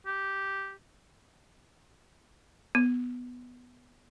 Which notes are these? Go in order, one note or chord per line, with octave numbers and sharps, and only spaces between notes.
G4
B3